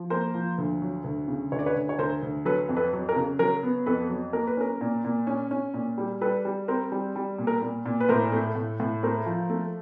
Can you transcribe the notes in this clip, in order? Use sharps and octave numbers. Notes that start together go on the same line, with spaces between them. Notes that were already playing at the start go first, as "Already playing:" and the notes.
Already playing: F3
A#3 A#4 C5
F3
D2
F#3
D2
C#3
D2 C#5
D5
B4 C#5
D2
C#5
D2 A#4 C5
D2
F#3 A4 B4
F2
A4 B4
F#3
A#4
C#3
F#3 A#4
B3
F2 A4 B4
F#3
A#3 A#4
B4
C#4 A#4
A#2
A#2
C#4
C#4
A#2
G3
G3 A4 B4
G3
C4 A#4 C5
G3
G3
A#2
A#4
A#2
A#2
B4
A2 A#4 C5
A3
A2
A2
A3 A#4 C5
F3
A3